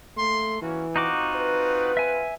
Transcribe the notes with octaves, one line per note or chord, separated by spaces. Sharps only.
A3 A#3 C6
E3 A#3 C#4 F#4
C4 D#4 F4 F#4 F#5 D6
B4
E5 G#5